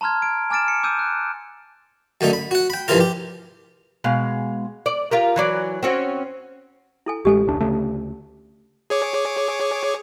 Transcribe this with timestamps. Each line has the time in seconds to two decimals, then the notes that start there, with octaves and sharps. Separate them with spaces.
0.01 A5 A#5 C6 F6 G#6
0.22 D7
0.50 G#5 D6 F6 A6 D7 E7
0.68 C#7
0.83 D6 E6 G6 D#7
0.99 F#6
2.21 F#2 D3 A3 D#4
2.33 B5
2.51 F#4 F#5
2.70 G5 B5
2.88 C2 G2 E3 F3 F4 A#4
3.00 G4
4.04 B2 G#3 F5
4.86 D5
5.11 F4 G4 A#4
5.36 E3 F#3 D5
5.83 C4 C#4 F#4
7.06 E4 A4 G#5
7.25 A1 G#3 G4 A4 G#5
7.45 E1 C#2 D4
7.60 D2 C#3 A3
8.90 G#4 C#5 D6